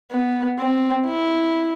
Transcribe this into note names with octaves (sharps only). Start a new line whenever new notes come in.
B3
C4
E4